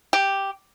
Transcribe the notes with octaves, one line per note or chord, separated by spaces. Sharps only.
G4